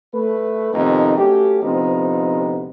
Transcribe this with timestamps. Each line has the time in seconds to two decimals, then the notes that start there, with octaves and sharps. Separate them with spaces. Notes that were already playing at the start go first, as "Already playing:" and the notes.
0.14 A3 B4
0.74 F2 C3 D#3 B3 D#4
1.17 F#3 A3 C#4 G4
1.63 D2 C3 F3 B3 C4 D#4